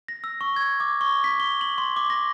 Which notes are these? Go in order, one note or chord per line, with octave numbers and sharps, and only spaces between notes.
A#6
E6
C#6
G#6
D6
C#6
B6
G7
F#7
C6
D6
A#6